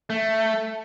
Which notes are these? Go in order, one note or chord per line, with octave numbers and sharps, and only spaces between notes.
A3